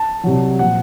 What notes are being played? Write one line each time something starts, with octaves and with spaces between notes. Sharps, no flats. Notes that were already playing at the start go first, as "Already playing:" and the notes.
Already playing: A5
C2 C3 F#3
A#2 F3 F#5